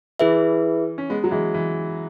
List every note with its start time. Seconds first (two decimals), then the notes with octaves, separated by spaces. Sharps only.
0.20 E3 E4 G#4 B4 E5
0.98 C#4
1.10 G#3 B3
1.24 F#3
1.31 E3 G#3
1.54 E3